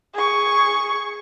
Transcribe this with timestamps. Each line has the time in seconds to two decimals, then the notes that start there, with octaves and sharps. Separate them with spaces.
0.14 G#4 C#6